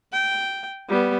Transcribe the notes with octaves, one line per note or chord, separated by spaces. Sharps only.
G5
G3 B3